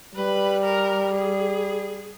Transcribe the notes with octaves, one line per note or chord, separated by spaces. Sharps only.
G3 B4
A#4
G#4